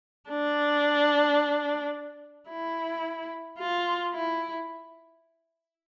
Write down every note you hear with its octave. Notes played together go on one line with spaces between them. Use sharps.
D4
E4
F4
E4